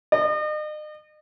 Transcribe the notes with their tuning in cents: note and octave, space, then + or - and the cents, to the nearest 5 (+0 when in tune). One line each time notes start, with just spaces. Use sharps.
D#5 -40